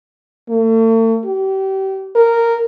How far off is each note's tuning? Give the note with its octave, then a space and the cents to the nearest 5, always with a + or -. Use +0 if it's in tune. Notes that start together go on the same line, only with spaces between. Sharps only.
A3 +40
G4 -30
A#4 -10